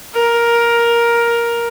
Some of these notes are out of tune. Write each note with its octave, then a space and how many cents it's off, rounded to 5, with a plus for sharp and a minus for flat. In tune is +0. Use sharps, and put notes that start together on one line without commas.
A#4 +10